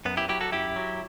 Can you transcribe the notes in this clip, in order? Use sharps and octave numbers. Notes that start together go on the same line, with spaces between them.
F#2 B3
E4 G4
F#3 E4 G4
F#4 A4
F#2 E4 G4
F#3